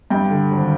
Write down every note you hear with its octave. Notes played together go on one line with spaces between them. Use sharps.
G2 G5
D3
G#1